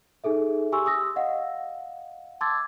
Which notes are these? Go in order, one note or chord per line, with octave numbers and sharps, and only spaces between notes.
D#4 G#4 A4 E5
G4 G#5 C6 C#6 E6
D#6 E6 A#6
D#5 F5 F#5
A5 C6 D6 E6 G#6 A6